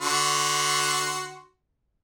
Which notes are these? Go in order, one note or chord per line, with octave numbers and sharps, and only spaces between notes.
D3 F#4 C6